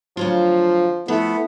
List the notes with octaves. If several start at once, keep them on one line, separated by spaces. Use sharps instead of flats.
D2 F3 F#3 F4
F3 A3 B3 E4